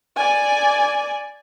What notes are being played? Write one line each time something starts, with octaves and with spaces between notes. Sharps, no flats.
D5 G#5